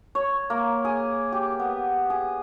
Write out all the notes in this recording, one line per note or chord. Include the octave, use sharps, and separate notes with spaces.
C#5
A#3
G#4
G4
B3
G#4